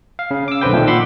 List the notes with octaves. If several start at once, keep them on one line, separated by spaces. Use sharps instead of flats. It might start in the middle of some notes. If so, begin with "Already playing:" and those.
F5
C#3
D6 E6
B1 D3 C4 B4 G5
A#2 D#3 F3 A3
F#5 B5 C6 D6 E6